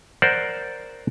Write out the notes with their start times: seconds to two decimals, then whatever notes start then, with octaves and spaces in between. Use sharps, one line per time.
0.22 A#4 C5 D5 F#5